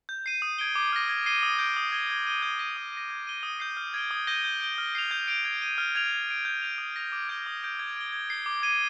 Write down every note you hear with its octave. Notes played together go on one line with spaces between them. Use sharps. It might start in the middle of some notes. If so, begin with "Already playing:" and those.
G6
C7 D#7
D#6
G#6 D7 G7
D6
F6 A#6
G#6
C7 D#7 G7
D#6
G6 D7
D#6
G#6 D#7 G7
G#6
D#7 G7
G6
A#6 D#7 G7
D#6
A#6 D#7
G#6
D#7 G7
D#6
G6 C7
F6
G#6 D7 G7
D#6
G6 A#6 D#7 G7
G6
D7 G7
F6
C7 F7
G6
D7 F7
G#6
D#7 G7
F6
G#6 D7 F7
G#6
D7 F7
G6
D7 F7
D#6
A#6 F7
D6
G6 D7 G7
D#6
G6 D7 G7
G#6
D7 G7
G#6
C7 G7
D6
G#6 D#7 G7